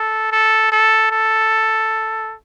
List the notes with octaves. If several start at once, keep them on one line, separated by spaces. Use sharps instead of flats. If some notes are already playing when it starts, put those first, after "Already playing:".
Already playing: A4
A4
A4
A4